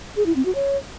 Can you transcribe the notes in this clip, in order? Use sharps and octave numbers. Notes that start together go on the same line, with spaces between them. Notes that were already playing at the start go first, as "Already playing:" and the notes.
G#4
E4
C4
F#4
C#5